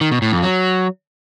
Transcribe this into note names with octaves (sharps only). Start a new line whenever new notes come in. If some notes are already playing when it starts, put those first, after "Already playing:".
D#3
B2
A2
F2
F#3